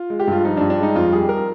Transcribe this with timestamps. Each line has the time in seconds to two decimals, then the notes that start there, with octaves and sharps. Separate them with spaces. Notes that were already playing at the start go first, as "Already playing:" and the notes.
Already playing: F4
0.10 G#3
0.20 G4
0.28 G2 F4
0.45 F3 D#4
0.57 G2 D4
0.70 D4
0.79 G#3 D#4
0.95 F2 F4
1.12 G3 G#4
1.29 A#4